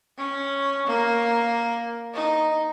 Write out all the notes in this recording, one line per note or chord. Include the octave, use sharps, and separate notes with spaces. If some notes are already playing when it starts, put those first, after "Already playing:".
C#4
A#3
D#4